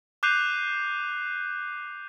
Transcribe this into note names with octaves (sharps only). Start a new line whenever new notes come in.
D6 F#6 G6 C7 D#7 F7